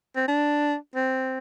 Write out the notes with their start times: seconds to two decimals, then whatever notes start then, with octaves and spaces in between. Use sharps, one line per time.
0.16 C4
0.28 D4
0.95 C4